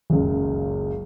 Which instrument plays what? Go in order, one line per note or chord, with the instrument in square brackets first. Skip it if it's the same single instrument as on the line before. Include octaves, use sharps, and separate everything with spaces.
[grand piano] F#1 C#2